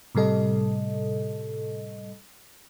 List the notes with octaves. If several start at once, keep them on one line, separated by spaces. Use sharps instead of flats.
A2 C3 G3 A4 D#5